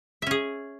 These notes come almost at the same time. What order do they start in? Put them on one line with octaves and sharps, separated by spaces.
E5 C#4 G#4